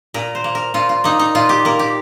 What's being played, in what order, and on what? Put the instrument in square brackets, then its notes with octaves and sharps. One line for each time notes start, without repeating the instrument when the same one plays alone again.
[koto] A#2 A#4
C5
A#3
A#4
A#2 F4
F4
A#3 D#4
D#4
A#2 F4
G4
A#3 A#4
G4